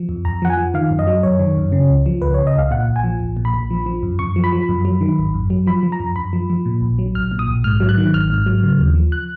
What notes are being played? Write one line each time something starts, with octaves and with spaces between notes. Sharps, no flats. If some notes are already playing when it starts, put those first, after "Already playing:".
Already playing: F3
F2
F2 A#5
F3 F#5
G#5
F3
D#3 F5
F#2
D#5
F#3
F#2 C#5
D#3
F#2
C#3
C#2
F3
C#2 B4
C#5
C#3
D#5
C#2 F5
A#2 F#5
A#1
G#5
F3
A#1
A#2
B5
A#1
F3
F3
F#2
F#2 C#6
F3
B5
F3
F#2
F#3
D#3
G#1
F#2
F#3
F3 B5
F3
A#5
F#2
F#2 B5
F3
F3
A#2
A#1
F#3
A#1 F6
A#2
D#6
A#1
G#2 F6
F#3
F#6
D#3
G#1 F6
G#2
F#3
C#3
D#2
F3
F#6